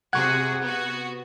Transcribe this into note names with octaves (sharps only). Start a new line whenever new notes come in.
C3 F#4 G#4 F#5 C#6 F#6 G#6
B3 F#4